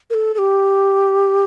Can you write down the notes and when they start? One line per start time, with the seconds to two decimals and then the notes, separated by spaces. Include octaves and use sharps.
0.10 A#4
0.14 A4
0.34 A4
0.38 G4